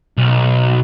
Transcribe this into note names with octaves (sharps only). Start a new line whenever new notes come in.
B1